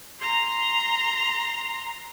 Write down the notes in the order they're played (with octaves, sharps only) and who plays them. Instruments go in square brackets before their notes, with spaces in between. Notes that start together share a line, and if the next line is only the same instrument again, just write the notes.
[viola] A#5 C6